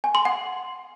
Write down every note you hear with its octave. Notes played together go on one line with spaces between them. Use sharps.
G#5
C6
F#5